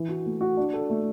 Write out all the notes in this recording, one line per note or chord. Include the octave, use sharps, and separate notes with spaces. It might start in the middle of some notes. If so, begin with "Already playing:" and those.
Already playing: E3
F#4
A3
F#4
D4
A4
A3